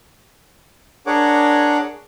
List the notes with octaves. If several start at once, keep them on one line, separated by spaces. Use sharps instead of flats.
D4 G#4 A#4 C#5 F#5 D6